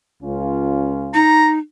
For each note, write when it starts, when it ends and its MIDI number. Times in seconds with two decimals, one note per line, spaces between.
0.23 1.23 37
0.23 1.23 61
0.23 1.23 65
1.14 1.58 63
1.14 1.50 82